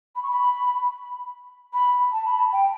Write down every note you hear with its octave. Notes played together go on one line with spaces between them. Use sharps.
B5
C#6
B5
B5
A5
B5
A5
G5